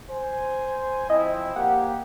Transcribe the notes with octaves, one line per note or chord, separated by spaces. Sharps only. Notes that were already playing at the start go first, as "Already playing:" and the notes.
C5 G#5
F3 C4 E4 D#5
A#3 G4 F#5